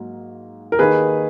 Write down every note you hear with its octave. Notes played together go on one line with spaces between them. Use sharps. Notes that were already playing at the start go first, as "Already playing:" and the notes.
Already playing: G#2 F#3 A#3
A#4
D#2 D#3 A#3 D#4 G#4 B4